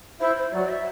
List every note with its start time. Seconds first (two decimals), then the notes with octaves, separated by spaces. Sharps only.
0.21 E4 C5
0.37 C5
0.53 F#3 D5
0.69 E5